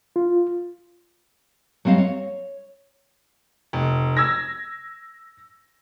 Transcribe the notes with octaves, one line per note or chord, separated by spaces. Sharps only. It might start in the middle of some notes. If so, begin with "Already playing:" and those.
F4
F#3 G3 C4 D#5 F5
C#5
F1
E6 G#6 A#6